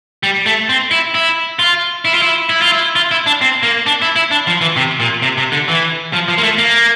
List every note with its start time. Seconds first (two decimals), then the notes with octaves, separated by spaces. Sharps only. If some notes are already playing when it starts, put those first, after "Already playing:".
0.23 G3
0.46 A3
0.69 C4
0.91 E4
1.15 E4
1.59 F4
2.05 E4
2.14 F4
2.22 E4
2.49 E4
2.62 F4
2.72 E4
2.96 F4
3.11 E4
3.26 D4
3.41 C4
3.63 A#3
3.86 D4
4.02 E4
4.16 E4
4.31 D4
4.47 F3
4.61 E3
4.76 C3
5.00 A#2
5.22 C3
5.37 C3
5.52 D3
5.68 E3
6.13 F3
6.28 F3
6.38 A#3
6.43 A3
6.58 A#3